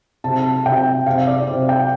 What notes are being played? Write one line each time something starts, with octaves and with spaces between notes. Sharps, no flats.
C3 A5
A5
C3 G5
C3 F5
D5
C3 C5
G5